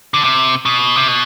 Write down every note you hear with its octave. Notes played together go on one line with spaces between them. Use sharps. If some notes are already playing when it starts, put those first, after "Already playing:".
D3
C3
B2
C3
B2